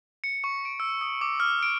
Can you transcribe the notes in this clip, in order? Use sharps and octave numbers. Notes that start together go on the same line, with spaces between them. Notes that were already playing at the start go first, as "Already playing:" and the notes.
C#7
C#6
D7
E6
D#6
D6
F6
D7